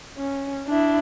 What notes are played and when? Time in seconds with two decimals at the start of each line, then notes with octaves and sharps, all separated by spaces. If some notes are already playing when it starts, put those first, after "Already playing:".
0.17 C#4
0.68 D4 E4